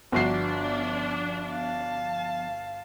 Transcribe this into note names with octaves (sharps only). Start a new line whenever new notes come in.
G1 F3 B3 D4 F#4 C7
F5 A5